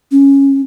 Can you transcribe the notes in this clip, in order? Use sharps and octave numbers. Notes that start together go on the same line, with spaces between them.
C#4